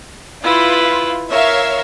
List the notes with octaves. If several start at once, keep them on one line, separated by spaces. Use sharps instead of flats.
E4 F4 B4
A#4 C#5 E5 F5